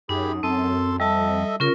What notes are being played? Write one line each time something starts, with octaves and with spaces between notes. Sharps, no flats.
F#2 D#4 G4 G#4 B5
F#2 C4 A4 A5 C6
F2 G3 A4 D#5 E5 A5
C#3 C#4 F4 A#4